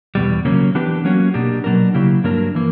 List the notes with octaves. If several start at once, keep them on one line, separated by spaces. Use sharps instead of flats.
E2 B2 G3
C#3 F#3 A#3 C#4
E3 B3 D4 G4 B4
F#3 A#3 C#4 F#4
B2 A#3 D4 G4
B2 F#3 A#3 D4 A#4
C#3 F#3 A#3 E4 G4
G2 F#3 A#3 D4 A#4
E3 A#3